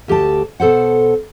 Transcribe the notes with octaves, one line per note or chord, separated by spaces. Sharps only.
D2 G4 D#5 A5
B2 A4 C5 F#5